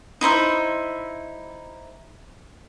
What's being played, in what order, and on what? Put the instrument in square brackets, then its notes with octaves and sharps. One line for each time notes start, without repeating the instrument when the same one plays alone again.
[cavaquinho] D#4 E4 C5 E5